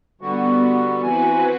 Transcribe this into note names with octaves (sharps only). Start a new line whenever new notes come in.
D3 G3 B3 F#4
E3 C4 F#4 B4 G#5